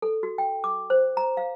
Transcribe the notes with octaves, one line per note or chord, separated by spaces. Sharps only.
A4
F#4
G5
D6
C5
A#5
F5